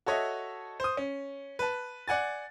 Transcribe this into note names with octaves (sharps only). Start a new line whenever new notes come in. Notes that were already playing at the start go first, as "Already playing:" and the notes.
F#4 A4 C#5 D#5 E5
C5 D#6
C#4
B4 A5
D5 F#5 G#5 A6